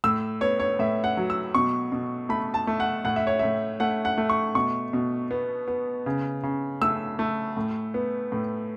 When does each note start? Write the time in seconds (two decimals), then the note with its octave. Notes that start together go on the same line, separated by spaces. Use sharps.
0.04 A2 E6
0.41 B3 C#5
0.60 C#5
0.79 A2 E5
1.04 F#5
1.17 F#3
1.30 E6
1.55 B2 C#6
1.92 B2
2.29 A3 B5
2.54 A5
2.67 A3
2.80 F#5
3.05 A2 F#5
3.16 E5
3.27 C#5
3.39 A2 E5
3.80 A3 F#5
4.05 F#5
4.18 A3
4.30 C#6
4.55 B2 C#6
4.93 B2
5.31 B3
5.68 B3
6.06 C#3
6.43 C#3
6.81 A3 E6
7.19 A3
7.57 A2
7.94 B3
8.32 A2